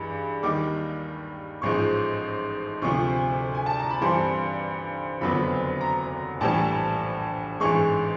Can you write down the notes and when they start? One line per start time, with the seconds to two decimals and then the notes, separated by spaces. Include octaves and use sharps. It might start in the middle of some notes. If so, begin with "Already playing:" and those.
Already playing: G2 E3 G#3
0.43 D#2 D#3 G3 D6
1.62 A1 G#2 F3 G#3 C#6
2.82 D2 C3 F3 C#6
3.55 G#5
3.66 A5
3.78 A#5
3.90 B5
4.01 G2 E3 G3 C4 C6
5.21 F#1 F2 D3 F#3 B3 B5
5.81 A#5
6.41 A#1 A2 E3 G3 A5
7.60 A1 G#2 E3 G#3 C#6